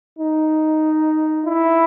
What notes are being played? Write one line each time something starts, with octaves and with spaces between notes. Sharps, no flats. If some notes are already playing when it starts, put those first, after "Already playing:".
D#4
E4